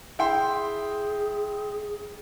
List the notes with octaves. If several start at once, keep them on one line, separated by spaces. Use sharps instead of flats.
E4 G#4 G5 C6